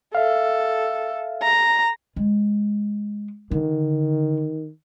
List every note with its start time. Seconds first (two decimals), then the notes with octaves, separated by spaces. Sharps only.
0.15 A4 E5 F5
1.43 A#5
2.16 G#3
3.51 D3 D#3